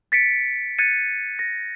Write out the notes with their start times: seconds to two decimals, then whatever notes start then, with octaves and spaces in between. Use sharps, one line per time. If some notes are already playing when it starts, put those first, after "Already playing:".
0.12 A6 B6 C#7 D7
0.79 F#6 G#6 A6 C#7 D#7
1.39 A#6